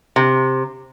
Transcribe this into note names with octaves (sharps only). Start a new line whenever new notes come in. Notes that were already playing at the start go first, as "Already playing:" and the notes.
C3